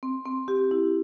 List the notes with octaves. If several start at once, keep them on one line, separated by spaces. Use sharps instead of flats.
C4
C4
G4
E4